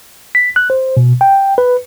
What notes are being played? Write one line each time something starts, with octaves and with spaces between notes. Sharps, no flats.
B6
F#6
C5
B2
G5
B4